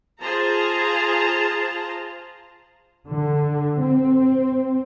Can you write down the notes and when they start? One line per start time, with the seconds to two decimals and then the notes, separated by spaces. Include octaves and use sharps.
0.20 F4 G#4 C5 A5 A#5
3.07 D3
3.82 C4